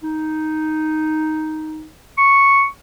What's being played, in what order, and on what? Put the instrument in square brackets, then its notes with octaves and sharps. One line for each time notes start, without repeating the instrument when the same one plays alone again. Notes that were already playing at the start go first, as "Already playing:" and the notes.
[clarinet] D#4
C#6